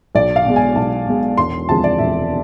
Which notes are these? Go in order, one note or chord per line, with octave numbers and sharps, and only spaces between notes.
B1 D5
F5
B2 G#3
G#5
B1 A5
B2 G#3
E1 C6
D2 C3 F3 G#3 A5
D5
E1 E5